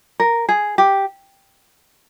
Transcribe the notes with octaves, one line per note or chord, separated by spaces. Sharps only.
A#4
G#4
G4